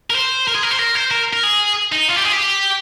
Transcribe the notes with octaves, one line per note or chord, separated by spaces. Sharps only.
A#4
C5
A#4
G#4
A#4
C5
A#4
C5
A#4
A#4
G#4
D#4
F4
G4
G#4
G4